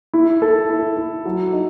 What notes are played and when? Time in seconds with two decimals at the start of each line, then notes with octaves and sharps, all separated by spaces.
0.14 E4
0.42 A4
0.70 E4
0.97 E4
1.25 F#3
1.53 D#4